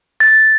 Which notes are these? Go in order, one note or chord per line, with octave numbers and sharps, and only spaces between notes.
A6